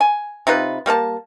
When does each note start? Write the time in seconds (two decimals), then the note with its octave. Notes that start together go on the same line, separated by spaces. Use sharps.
0.01 G#5
0.47 C3 D#4 F4 B4
0.86 G3 A#3 A#4 A5